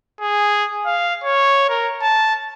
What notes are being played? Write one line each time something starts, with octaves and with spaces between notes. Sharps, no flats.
G#4
F5
C#5
A#4
A5